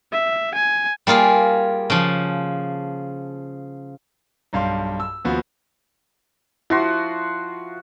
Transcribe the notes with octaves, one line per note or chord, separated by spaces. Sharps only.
E5
G#5
G3 A#3 F4 G#4
C#3 F3
B1 G2 F5 C6
E6
D#2 F3 B3 F#4
F3 E4 F#4 C6